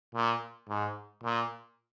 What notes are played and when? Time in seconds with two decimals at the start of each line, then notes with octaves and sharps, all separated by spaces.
0.15 A#2
0.69 G#2
1.23 A#2